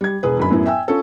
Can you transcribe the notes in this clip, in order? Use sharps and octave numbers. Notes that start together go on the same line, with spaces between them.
G3 G#6
E1 G#4 B4
G1 F#2 B5
F#2 A2 B3 E4
E5 G5 G#5 E6
C#4 F4 A4